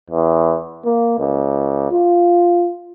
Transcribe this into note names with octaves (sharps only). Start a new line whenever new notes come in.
E2
A#3
C#2
F4